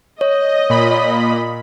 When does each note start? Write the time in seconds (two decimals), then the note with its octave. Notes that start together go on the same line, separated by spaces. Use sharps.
0.21 C#5 D#5
0.69 A#2 B5